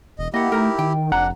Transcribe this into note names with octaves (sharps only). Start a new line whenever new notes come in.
E1 D#5
A#3 E4 G4 D#5 F#5
A3 D#4 A#4
D#3 G5
F1 D4 F#5 A#5